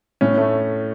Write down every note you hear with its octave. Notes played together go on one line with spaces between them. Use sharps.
A2 C#4
A3